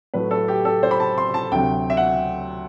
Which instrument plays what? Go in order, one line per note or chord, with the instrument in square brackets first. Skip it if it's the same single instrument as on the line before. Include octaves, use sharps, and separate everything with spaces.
[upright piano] A2 F#3 A3 B4
A4
G4
A4
C5
B5
A5
C6
A5
D2 C3 F#3 G5
E5
F#5